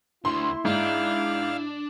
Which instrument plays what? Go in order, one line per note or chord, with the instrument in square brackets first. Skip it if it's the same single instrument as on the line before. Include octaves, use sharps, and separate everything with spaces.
[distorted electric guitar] D2 D3 [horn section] E4 [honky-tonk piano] C6
[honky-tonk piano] G#2 [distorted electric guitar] D4 [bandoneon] F5